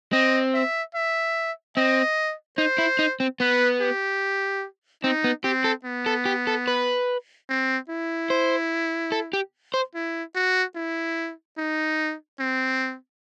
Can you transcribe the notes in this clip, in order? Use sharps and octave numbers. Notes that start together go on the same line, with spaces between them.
C4 D#5
E5
E5
C4 D#5
D#4 C5
E4
D#4
C4
B3 B4
G4
C4 D#4
B3
C4 G4
A4
B3
A4
G4
A4
B4
C4
E4
C5
A4
G4
C5
E4
F#4
E4
D#4
C4